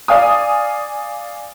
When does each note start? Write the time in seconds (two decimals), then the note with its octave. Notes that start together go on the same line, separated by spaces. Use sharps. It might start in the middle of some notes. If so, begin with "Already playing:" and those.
0.08 D5 F5 G#5 D#6